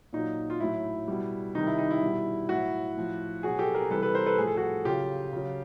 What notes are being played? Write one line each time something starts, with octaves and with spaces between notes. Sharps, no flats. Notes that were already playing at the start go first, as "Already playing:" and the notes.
A#2 F#3 D#4
F4
A2 F#3 E4
B2 G3
C3 D#3 G3 D#4
E4
D#4
E4
B2 G3
A2 F#3 E4 F#4
A2 F3
B2 F#3 F#4 G#4
G4 A4
G#4 A#4
C3 E3 G3 A4 B4
A4 B4
A#4 C5
A4 B4
A2 F3 G#4
A4
F#4 G#4
C#3 F#3 F4 G4
C#3 F#3